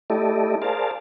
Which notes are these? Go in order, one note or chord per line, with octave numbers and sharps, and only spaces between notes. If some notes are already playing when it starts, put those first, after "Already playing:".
A3 E4 G4 A4 D5 D#5
G#4 A#4 C5 D5 F5 A5